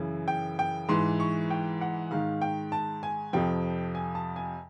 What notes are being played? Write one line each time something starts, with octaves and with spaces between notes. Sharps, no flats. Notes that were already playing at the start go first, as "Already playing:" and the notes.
Already playing: F#2 C#3 E3
G5
G5
G#2 E3 C6
C#6
G5
F#5
G#2 D#3 F5
G5
A5
G#5
F2 C3 F3 G5
G#5
A5
G#5